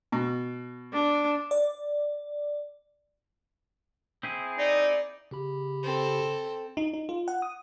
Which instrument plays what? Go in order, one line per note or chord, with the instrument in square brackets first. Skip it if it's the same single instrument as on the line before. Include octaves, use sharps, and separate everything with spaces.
[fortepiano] B2
[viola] D4
[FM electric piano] D5
[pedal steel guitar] C4 E4 G#4
[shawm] D#4 [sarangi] D5
[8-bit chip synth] C#3 G4 B5
[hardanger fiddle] C4 A4
[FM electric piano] D#4
D#4
F4
F#5
D#6